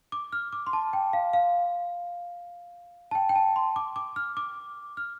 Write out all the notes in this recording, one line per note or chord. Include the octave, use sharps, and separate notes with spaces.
D6
F6
D6
C6
A5
G5
F5
F5
A5
G5
G5
A5
C6
D6
D6
F6
D6
F6